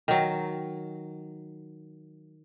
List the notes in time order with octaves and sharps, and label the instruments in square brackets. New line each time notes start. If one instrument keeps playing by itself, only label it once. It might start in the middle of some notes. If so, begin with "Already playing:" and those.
[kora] D#3 F#3